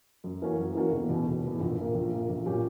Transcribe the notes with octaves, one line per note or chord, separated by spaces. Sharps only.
F#2
E3 A#3 C#4 F#4
F#2
E3 A#3 C#4 F#4
E1
E2 B2
E1
E2 B2
A#1
A#2 A#3
A#1
A#2 A#3
A#1
A#2 F#3 C#4 G4